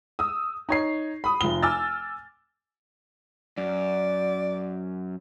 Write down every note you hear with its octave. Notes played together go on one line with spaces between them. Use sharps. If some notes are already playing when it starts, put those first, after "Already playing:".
D#6 E6
D#4 C#5 C7
B5 D#6
F1 F3 G7
G#5 D6 E6 F6 A6
F#2 D5